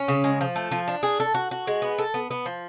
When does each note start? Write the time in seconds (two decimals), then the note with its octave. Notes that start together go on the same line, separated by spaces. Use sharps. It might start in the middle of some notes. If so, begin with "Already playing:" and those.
Already playing: C#4
0.08 C#3
0.24 G#3
0.41 F3
0.56 A3
0.71 F3
0.88 D4
1.03 G#4
1.20 A4
1.34 F#4
1.51 F#4
1.67 G#3
1.82 B3
1.98 A4
2.14 B3
2.31 B3
2.46 F3